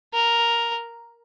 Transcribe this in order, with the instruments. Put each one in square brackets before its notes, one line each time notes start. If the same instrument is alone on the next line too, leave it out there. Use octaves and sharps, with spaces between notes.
[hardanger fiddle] A#4